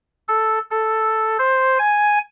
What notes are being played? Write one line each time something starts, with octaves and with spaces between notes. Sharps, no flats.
A4
A4
C5
G#5